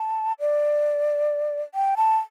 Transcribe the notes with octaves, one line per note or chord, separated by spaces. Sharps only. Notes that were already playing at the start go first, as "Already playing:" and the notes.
Already playing: A5
D5
G5
A5